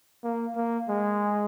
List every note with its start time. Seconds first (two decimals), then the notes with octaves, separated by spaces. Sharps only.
0.24 A#3
0.56 A#3
0.89 G#3